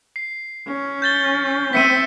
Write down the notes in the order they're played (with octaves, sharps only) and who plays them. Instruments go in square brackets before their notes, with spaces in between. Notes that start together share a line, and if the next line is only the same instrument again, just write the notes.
[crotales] C7
[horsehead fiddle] C#4
[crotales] G6 A6 G7
[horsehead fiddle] C4 E5 [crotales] B6 C#7 D#7